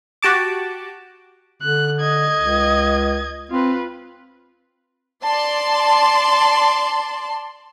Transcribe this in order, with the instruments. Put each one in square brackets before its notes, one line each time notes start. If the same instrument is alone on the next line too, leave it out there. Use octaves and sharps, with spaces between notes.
[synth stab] F#4 G4 A5 D6
[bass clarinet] D3 [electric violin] F#6
[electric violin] D#5 G#6
[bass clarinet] C#2
[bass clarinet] C4 [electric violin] F4 B4
[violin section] D5 A5 C6